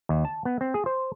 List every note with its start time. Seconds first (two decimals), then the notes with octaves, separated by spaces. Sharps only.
0.09 D#2
0.25 A5
0.45 B3
0.61 C4
0.74 G#4
0.86 C5